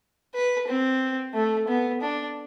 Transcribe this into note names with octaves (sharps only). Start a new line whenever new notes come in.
B4
C4
A3
B3
D4